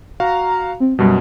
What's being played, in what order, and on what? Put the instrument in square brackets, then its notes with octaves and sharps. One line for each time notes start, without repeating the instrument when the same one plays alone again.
[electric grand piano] F#4 F5 [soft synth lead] A#5
[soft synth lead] C4
[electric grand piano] F#2 B2 [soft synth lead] G3